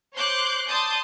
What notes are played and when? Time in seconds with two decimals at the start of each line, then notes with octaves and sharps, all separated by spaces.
0.16 C5 C#5 C6 D6 F#6 G6
0.69 D5 A5 C6 D#6 G6